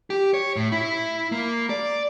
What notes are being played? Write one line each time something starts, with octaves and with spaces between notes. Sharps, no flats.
G4
C#5
A2
E4
A#3
D5